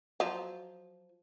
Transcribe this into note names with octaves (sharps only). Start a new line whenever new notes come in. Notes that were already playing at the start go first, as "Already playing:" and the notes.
F3 F#3